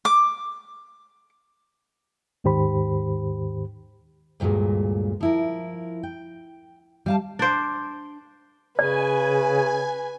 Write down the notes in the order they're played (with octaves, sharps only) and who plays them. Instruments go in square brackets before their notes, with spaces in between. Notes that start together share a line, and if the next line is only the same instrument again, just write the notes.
[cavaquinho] D6
[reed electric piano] D#2 G#2 D#3 G4 C5 B5
[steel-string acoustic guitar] D2 G2 A#2 F#3 G#3
F3 E4 A#4
G5
G3 F5 A5
[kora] D4 C5
[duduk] C#3 [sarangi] B4 [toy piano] D5 [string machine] G#5